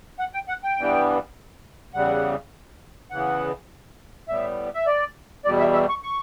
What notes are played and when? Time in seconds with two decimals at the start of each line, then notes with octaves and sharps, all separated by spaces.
0.19 F#5
0.34 G5
0.48 F#5
0.64 G5
0.77 G2 E3 G3 B3
1.94 E2 C#3 G3 F#5
3.11 E2 C#3 E3 B3 F#5
4.28 A2 G3 B3 E5
4.74 E5
4.87 D5
5.45 E2 B2 G3 D5
5.59 E5
5.74 E5
5.89 C#6
6.03 C#6